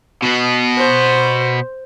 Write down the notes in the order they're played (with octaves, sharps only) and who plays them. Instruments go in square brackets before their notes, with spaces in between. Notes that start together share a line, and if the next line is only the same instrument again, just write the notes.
[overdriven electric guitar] B2 B3
[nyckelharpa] C5